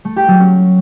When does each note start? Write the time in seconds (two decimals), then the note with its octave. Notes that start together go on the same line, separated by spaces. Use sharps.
0.05 A3
0.16 G4
0.28 F#3
0.40 C#4